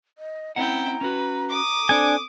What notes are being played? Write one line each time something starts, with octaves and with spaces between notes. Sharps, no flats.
D#5
C4 C#4 E4 F#5 G5 A#5
C#4 F#4 B4
D6 D#6
C4 D4 A4 C5 G#5